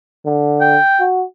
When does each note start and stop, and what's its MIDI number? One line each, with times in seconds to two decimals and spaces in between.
0.26 0.77 50
0.61 1.04 79
1.00 1.24 66